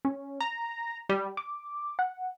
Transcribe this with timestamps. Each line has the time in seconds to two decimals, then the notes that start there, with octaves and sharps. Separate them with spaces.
0.05 C#4
0.41 A#5
1.09 G3
1.37 D6
1.99 F#5